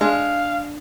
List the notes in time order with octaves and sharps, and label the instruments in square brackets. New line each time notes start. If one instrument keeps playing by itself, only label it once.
[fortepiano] G#3 [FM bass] D4 [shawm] F5